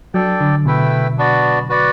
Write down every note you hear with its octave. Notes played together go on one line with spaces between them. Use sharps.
F#3 D4 A4 D5 G5
D3
B2 A3 E4 B4 E5 G5
B3 D4 F#4 B4 D5
F#4 B4 D5 F#5